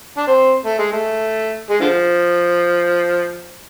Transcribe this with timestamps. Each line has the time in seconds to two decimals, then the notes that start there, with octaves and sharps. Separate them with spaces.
0.18 D4
0.27 C4
0.66 A3
0.79 G#3
0.93 A3
1.70 G#3
1.80 D3 F3